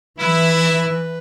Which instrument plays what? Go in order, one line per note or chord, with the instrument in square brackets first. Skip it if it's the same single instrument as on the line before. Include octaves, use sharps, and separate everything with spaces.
[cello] E3 [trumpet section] E4 [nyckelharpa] B4